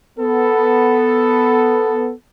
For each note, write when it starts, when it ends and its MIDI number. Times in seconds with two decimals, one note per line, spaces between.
0.19 2.12 59
0.19 2.12 69